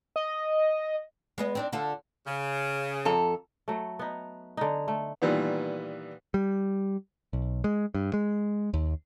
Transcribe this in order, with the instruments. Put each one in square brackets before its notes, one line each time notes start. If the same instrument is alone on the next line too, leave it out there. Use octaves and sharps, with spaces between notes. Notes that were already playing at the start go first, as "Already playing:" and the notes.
[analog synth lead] D#5
[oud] G#3 B3 D#5
C4 D4 D#4
D3 F4 A4
[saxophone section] C#3
[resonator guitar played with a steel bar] F2 A4 A#5
[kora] F#3 A3
B3 D#4
D3 D#4
A3
[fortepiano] A#2 D#3 E3 G3 B3
[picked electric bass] G3
B1
G#3
G2
G#3
D#2